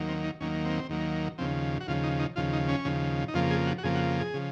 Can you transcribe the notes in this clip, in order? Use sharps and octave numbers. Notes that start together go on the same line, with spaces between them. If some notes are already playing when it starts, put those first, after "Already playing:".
Already playing: D#2 D#3 F#3 A#3
C4
D#4
D#2 D#3 F#3 A#3 C#4
C4
D#2 D#3 F#3 A#3
D#2 C#3 F3 C4
F#4
D#2 C#3 F3 F4
D#4
D#4
D#2 C#3 F3 F4
D#4
C#4
D#2 C#3 F3
D#4
F2 C#3 F3 A#3 F4
G#4
F#4
F#4
F2 C#3 F3 A#3 G#4
F#4
G#4
C#3 F3